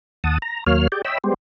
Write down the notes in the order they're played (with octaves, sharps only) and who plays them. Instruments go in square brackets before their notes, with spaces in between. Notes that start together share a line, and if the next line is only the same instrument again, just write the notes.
[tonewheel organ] D#2 F#5 A5 D#6
A#5
D#2 F#3 A#3 C#5 F5 F6
G4 G#4 D5 G5
C#5 D#5 E5 G5 B5 E6
G3 G#3 B3 G4 C5